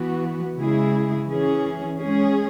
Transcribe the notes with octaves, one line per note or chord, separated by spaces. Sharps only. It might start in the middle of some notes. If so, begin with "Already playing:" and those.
Already playing: E3 B3 F#4
C#3 G#3 E4 G#4
E3 C#4 G#4
G#3 C#4 G#4